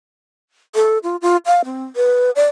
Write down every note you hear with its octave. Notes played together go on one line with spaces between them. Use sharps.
A4
F4
F4
F5
C4
B4
D5